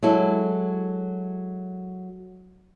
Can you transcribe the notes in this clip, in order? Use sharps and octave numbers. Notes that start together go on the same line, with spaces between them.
F#3 G#3 E4 A4